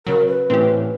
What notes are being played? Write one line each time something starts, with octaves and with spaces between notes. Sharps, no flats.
C#3 F#3 A#4
B4
A2 E3 C4 C#4 G4